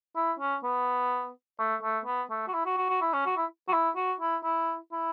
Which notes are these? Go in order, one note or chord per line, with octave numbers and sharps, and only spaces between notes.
E4
C#4
B3
A3
A3
B3
A3
F#4
E4
F#4
F#4
F#4
E4
C#4
F#4
E4
F#4
E4
F#4
E4
E4
E4